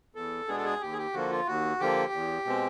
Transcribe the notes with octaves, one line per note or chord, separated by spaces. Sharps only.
E2 A4
B2 G#3 B3 D4 G#4
A4
G#4
D#2 G4
G#4
G4
D3 F3 A#3 F#4
F4
D#2 F#4
D3 F3 A#3 G4
E2
B2 G#3 C4